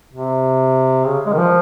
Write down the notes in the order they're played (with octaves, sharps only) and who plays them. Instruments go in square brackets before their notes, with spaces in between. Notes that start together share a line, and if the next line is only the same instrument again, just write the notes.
[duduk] C3
C#3
G#3
D#3
F3